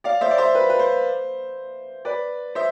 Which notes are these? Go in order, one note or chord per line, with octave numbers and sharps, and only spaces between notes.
D5 F5
C5 E5
D5
C5 E5
B4
B4
C5
B4 D5
C5 E5